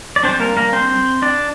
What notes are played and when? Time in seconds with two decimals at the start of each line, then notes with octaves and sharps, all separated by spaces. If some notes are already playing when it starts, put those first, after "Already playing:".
0.16 D5
0.23 G3 C4 D4 C5
0.40 A#3 A#4
0.57 A#3 A#4
0.73 C4 C5
1.22 D4 D5